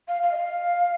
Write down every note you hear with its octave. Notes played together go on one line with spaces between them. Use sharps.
F5
F5
D#5
F5